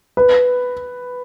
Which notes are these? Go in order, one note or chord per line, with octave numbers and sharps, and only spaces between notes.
B4